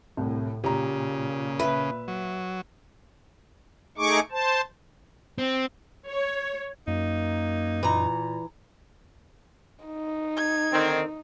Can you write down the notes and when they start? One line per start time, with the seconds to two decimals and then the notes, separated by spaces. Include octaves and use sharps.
0.17 C2 A2
0.64 A#2 C#3 G4 A#5
1.59 B4 E5
2.08 F#3
3.98 A3 D#4 G#4 C#6 D6
4.32 C5 A5
5.38 C4
6.10 C#5
6.87 F#2 A#3 D#4
7.83 A#2 E3 A#5
9.85 D#4
10.37 G#6
10.72 D3 D#3 C4